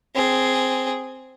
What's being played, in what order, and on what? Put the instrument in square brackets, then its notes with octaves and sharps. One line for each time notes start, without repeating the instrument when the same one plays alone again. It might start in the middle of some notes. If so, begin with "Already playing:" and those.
[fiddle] C4 G#4